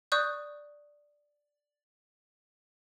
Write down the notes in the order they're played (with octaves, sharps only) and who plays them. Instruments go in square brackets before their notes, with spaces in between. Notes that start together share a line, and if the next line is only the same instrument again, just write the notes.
[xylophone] D5 C#6 D#6 F#6 G6